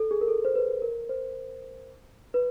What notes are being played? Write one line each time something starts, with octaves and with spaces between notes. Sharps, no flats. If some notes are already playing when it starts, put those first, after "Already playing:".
Already playing: A4
G#4
A#4
A4
C5
B4
A#4
C5
B4